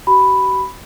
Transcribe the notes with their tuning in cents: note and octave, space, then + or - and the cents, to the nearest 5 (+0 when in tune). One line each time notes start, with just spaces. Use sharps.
F#4 +45 B5 +0